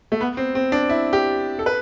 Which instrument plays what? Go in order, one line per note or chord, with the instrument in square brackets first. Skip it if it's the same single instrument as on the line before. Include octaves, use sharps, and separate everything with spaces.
[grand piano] A3
B3
C4
C4
D4
E4
G4
A4
B4